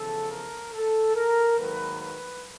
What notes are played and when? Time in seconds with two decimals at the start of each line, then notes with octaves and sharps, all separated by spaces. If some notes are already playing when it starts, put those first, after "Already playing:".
Already playing: E2 C#3 F3 A4
0.31 A#4
0.73 A4
1.15 A#4
1.58 G#2 D#3 F#3 A#3 B4
2.01 B4